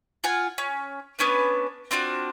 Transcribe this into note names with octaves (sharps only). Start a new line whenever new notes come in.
F4 F#5 G#5
C#4
B3 C#4 D4 B4
C4 D4 F4 F#4